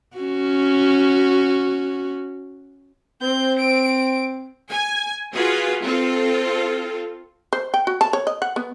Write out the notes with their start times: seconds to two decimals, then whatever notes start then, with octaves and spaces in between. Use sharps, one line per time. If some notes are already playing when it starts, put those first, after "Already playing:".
0.17 C#4 F#4
3.22 C4 G6
3.59 D7
4.70 G#5
5.35 F4 F#4 G#4 B4
5.83 C4 F4 A4
7.53 C5
7.74 G5
7.87 F#4
8.01 A5
8.13 C#5
8.27 D#5
8.42 F#5
8.56 B3